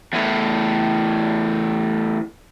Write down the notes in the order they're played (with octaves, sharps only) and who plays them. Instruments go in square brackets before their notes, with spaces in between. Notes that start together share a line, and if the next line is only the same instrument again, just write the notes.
[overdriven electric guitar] E2 A2